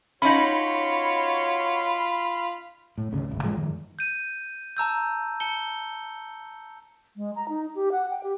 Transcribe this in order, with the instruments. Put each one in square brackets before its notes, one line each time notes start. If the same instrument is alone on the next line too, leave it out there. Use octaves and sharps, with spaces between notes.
[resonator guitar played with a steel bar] C#4 D#4 [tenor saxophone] F4 [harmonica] F#4 C#5 [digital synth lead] B5
[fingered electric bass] A2
G#1 D2 C#3
D1 G1 C#2
A2 E3 F3 G#3
F#2 D#3
[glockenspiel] G6 D#7
A5 A#5 E6 G6
A5 C#7 G7
[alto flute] G#3
A#5
D#4
G4
F#5
G5
G4